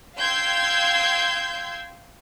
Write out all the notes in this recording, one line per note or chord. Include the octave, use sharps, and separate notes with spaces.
F5 G5 C6 E6 G6 G#6